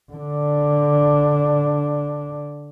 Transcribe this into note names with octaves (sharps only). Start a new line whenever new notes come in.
D3 D4